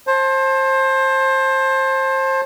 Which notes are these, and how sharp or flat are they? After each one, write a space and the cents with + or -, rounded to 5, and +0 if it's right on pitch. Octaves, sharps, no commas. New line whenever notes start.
C5 +25 A5 +0